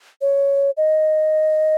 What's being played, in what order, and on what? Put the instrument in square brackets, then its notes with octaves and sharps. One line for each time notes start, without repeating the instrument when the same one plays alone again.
[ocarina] C#5
D#5